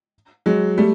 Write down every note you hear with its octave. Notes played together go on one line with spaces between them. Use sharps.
F#3 G#3
G3 A3